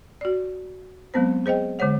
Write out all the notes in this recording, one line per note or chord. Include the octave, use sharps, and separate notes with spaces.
F#4 D5
F#3 G#3 B3 C4 C5
G#4 C5 D#5 G5
D3 G#3 C5 C#5 F#5